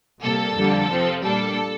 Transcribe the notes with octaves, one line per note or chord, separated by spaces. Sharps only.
C3 G3 A#3 A4
F2 D3 G3 A#3
C3 F3 C4
A#2 G3 A#3 D4 A4